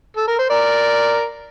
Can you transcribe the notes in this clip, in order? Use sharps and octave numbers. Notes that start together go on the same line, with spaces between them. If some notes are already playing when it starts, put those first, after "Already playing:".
A4
A#4
C5
A#4 D5